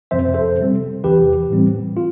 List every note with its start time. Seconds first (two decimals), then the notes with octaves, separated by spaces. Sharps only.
0.11 F2 C3 F3 C4 C5 E5
0.34 A4 C5
0.58 C3 G3 C4
1.04 E2 C3 E3 G4 B4
1.50 A2 E3 G3 C4
1.97 F4